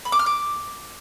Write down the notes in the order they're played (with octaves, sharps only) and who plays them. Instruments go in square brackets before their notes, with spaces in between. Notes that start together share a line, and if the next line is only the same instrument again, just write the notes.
[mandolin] B5
D6
F6
D6